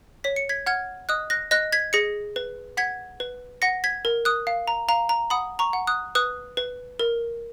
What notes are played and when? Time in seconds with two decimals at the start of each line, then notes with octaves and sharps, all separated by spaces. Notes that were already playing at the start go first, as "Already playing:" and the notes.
0.24 C#5 B6
0.36 C#7
0.49 G#6 B6
0.66 F#5 F6 G#6
1.09 D#5 D#6 F#6
1.30 F#6 A#6
1.51 D#5 F#6 A#6
1.72 G#6 B6
1.93 G#4 A#6 C#7
2.36 B4
2.77 F#5 G#6 B6
3.20 B4
3.62 F#5 A#6 C#7
3.84 G#6 B6
4.05 A#4
4.25 D#6 F#6
4.47 F5
4.68 A#5
4.89 F5 A#5
5.09 A#5
5.30 F#5 B5 D#6
5.59 A#5 C#6
5.73 F#5
5.87 D#6 F#6
6.15 B4 D#6 F#6
6.57 B4
6.99 A#4